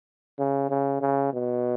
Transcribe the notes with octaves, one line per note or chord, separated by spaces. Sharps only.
C#3
C#3
C#3
B2